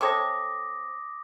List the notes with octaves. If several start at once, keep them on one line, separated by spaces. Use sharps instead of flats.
C3 A4 C#5 D6 D#6 A#6